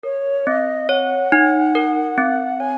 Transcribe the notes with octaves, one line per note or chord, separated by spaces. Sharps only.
A#4 C#5
C4 D#5
C#5 F#5
D#4
A#4
C4
C#5 G#5